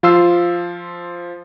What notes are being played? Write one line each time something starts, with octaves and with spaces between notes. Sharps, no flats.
F3 F4 C6 E6 C7